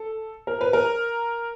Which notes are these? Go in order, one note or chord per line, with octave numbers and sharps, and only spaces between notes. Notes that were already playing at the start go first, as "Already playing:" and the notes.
Already playing: A4
A#4
B4
A#4